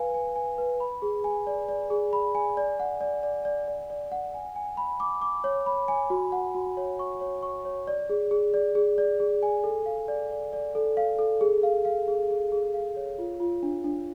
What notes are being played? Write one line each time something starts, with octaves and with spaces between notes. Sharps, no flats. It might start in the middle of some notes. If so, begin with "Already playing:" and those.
Already playing: B4 F5 G#5
G#5
G#5
B4
B5
G#4
G#5
D5
D5
G#4
B5
G#5
D5
F#5
D5
D5
D5
D5
D5
F#5
G#5
G#5
B5
D6
D6
C#5
B5
G#5
F#4
F#5
F#4
C#5
C#6
C#5
C#6
C#5
D5
G#4
G#4
D5
G#4
D5
G#4
G#5
A4
F5
D5
D5
D5
A4
F5
A4
G#4
F5
F5
G#4
G#4
G#4
F5
C#5
F4
F4
D4
D4